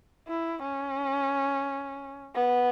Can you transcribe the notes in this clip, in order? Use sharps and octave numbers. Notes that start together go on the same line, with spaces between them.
E4
C#4
B3